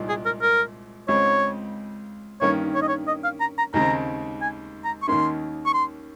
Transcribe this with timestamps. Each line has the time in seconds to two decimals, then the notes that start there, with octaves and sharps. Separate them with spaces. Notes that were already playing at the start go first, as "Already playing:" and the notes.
Already playing: C2 A#2 G#3
0.09 G#4
0.25 A#4
0.42 A#4
1.08 C#2 C#3 G#3 C4 C#5
2.41 G2 D#3 A#3 C#4 C#5
2.75 C#5
2.82 D#5
2.88 C#5
3.07 D#5
3.24 F5
3.40 A#5
3.58 A#5
3.74 D#2 C#3 G#3 C4 A#5
4.41 G#5
4.84 A#5
5.02 C#6
5.07 D#2 D#3 A#3 C#4 C6
5.66 C#6
5.74 C6